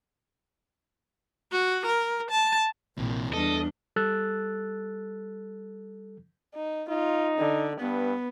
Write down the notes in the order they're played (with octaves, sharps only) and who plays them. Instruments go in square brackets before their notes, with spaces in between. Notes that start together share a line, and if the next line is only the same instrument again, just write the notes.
[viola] F#4
A#4
A5
[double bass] A#1 [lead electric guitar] C3 E3
[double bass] E2 [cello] G3 D4 [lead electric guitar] A4 [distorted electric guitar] D#5
[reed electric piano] G3 A4 E6 F#6 A6
[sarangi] D#4
[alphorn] D#4 [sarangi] F4
[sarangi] D3
[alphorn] G2 [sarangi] B3